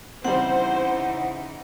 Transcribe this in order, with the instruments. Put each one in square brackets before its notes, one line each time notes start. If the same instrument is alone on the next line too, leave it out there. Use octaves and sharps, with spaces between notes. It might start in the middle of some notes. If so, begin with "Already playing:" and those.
[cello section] C#3 E3 D#4 [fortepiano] G3 C4 [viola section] C5 [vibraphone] F#5